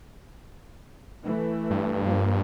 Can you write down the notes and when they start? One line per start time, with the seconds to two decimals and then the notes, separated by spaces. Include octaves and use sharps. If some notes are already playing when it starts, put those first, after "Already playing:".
1.23 E3 A3
1.71 G2
2.04 F3 A#3